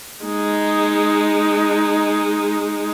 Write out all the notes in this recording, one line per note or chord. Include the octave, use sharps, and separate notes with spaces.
G#3 D#4